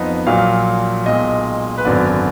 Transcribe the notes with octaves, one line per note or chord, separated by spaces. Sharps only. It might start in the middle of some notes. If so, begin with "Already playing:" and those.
Already playing: F2 F3 B3 D#4 D#5
A#1 A#2 F#3 F5
B1 A#2 G#3 D#5
B4
G#1 F#2 D3 F#3 B3 D5